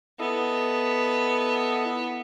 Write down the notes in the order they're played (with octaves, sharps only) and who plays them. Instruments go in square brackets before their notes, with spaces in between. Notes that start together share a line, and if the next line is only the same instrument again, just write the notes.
[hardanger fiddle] B3 [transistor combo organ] E4 A4 D#5